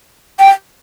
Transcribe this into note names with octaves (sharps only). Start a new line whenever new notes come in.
G5